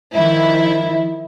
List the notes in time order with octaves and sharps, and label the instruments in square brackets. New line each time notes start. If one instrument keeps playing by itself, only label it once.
[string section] D#3 F3 E4